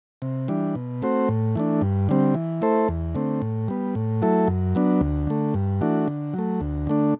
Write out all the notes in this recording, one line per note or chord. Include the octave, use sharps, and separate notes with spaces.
C3
E3 G3 D4
B2
A3 C4 F#4 C5
A2
E3 A3 D4
G2
D3 G3 C4
E3
A3 E4 A4 C5
E2
D3 A3 C4
A2
G3 B3
A2
F#3 A3 E4 A4
F#2
F#3 B3 D4
D2
D3 A3
G2
E3 A3 D4 F#4
D3
F#3 A3
D2
D3 A3 D4